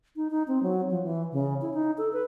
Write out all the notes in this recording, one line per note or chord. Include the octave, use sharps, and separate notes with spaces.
D#4
D#4
C4
F#3
F3
E3
C#3
E4
D#4
A4
B4